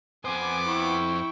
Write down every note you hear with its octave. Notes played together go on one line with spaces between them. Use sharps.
F2 B3 C5 G#5 D6
E4 G5 C#6